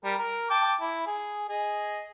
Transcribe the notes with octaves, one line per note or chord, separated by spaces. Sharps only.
G3 A#4
A#4
G5 A5 D6
E4
G#4
G#4 D#5